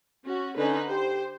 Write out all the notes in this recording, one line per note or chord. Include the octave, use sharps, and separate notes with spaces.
C#4 F#4
D3 C#4 D#4 B4
G4 C5